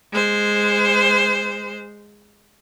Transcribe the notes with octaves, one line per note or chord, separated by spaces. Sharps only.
G#3 C5